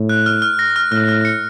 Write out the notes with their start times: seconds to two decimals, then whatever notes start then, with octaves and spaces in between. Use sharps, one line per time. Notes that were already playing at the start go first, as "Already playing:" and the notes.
Already playing: A2
0.09 F#6
0.26 F6
0.42 F6
0.59 A#6
0.76 F6
0.92 A2 F6
1.09 F6
1.25 C#7